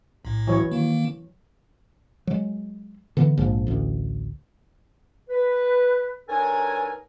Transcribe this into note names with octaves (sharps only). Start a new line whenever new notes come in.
B1 A2
E3 F#3 C#5
D#3 A#3
F#3 G#3
D3 E3 B3
A#1 G#2 F3
A1 D2
B4
G2 D#4 A4 A#4 C#5 G#5